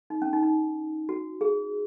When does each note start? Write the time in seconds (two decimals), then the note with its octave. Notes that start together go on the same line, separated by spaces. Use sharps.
0.10 D#4
0.22 C#4
0.33 D#4
0.43 D#4
1.09 F#4
1.41 G#4